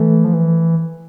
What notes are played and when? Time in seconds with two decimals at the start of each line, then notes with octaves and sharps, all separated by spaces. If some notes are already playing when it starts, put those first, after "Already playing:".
Already playing: E3 A3
0.24 F3
0.34 E3